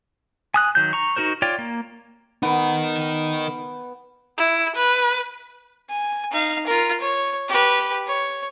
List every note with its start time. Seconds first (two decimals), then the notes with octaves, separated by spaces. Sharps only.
0.54 G#5 D#6 F#6
0.75 D#3 F#3 G6
0.93 A#5 C#6
1.17 D#4 F#4 A#4 C5
1.42 F4 C#5 D5 G5
1.59 A#3
2.43 B3 D#4 A#4
4.38 E4
4.76 B4
5.89 G#5
6.32 D#4 F5
6.66 F4 A#4
7.00 C#5
7.48 G4 B4
8.07 C#5